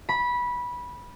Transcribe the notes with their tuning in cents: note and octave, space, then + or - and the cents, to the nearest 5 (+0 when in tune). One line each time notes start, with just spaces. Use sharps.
B5 -15